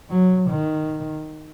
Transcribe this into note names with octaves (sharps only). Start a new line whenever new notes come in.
F#3
D#3